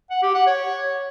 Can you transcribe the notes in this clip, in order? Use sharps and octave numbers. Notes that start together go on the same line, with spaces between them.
F#5
G4
F#5
C#5